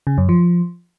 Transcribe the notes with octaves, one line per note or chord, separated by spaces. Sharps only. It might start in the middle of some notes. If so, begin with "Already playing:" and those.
C#3
F#2
F3